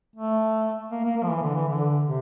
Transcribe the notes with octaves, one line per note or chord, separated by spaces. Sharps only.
A3
A#3
A#3
A#3
F3
E3
D3
E3
D3
C3